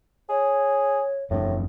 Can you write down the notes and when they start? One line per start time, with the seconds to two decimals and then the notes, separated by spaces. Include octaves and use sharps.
0.30 G#4 C#5
1.31 F#1 A2 A3 D4